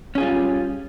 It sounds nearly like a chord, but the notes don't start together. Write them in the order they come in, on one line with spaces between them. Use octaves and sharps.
C#4 G#4 F4 G3